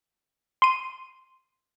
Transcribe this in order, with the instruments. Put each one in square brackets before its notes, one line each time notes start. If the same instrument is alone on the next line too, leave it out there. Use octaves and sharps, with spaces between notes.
[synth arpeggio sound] C6 D#7